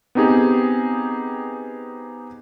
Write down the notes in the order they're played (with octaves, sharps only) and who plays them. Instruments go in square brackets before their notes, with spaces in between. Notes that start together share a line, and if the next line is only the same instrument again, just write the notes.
[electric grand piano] B3 C4 D#4 G4 G#4